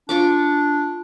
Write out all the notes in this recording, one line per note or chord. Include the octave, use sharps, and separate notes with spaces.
D4 F4 C#6 D6